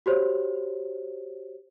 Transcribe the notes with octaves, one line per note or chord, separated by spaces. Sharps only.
F#4 G4 C5 C#5